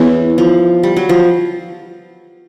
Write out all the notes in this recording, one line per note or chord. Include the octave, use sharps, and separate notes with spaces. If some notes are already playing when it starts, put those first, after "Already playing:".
Already playing: E3 B3 E4 G#4 C#5
F3
G3
F#3
F3